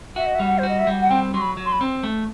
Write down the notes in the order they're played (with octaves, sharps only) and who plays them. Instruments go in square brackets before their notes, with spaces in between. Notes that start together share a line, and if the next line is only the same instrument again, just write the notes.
[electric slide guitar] F#4 [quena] E5
[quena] D#5
E5
[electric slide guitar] G3
[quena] F#5
[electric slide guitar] F#4 [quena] C5
[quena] D#5
E5
[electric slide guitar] G3
[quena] F#5
[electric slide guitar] C4 [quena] G5
[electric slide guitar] F#3 [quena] C6
[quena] B5
[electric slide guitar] F#3
[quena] C6
B5
[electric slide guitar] C4
A3